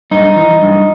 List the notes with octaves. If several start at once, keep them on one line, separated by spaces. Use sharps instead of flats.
G2 D#4
E3
G2